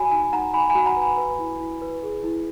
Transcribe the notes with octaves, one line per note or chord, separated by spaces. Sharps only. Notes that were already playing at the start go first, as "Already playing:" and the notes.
Already playing: F#4 C#5 G#5 B5
D#4 G#5
D#4 F#5 A#5
D#4 G#5 B5
G#5 B5
F#4
F#5 A#5
B4
G#5 B5
B4
E4
E4
B4
G#4
E4